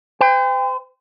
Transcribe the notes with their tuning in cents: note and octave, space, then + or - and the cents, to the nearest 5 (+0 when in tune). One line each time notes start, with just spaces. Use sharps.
C5 -40 G5 +30